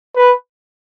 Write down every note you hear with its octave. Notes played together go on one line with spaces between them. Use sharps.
B4